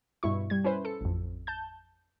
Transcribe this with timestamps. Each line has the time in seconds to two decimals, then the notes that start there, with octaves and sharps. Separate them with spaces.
0.23 G2 B2 E4 C#6
0.50 G3 G#6
0.64 C#4 E4 B4 C5
0.85 A4 C#7
1.01 A1 F2
1.47 A5 G6